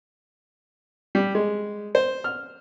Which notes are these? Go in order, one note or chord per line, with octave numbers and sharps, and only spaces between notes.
G3
G#3
C5
F6